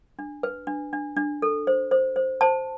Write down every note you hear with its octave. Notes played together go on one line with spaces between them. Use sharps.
D4
B4
D4
D4
D4
A4
C5
C5
C5
C5 A5